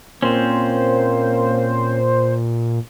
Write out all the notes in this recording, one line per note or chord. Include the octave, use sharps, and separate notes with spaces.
A#2 A#3 C4 C#4 C5